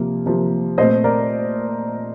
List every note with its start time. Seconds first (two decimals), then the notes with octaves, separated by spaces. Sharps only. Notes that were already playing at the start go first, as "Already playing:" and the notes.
Already playing: C3 F3 A#3
0.26 C3 F3 A#3
0.78 A#2 A3 C4 C5 D#5
1.04 A#4 D5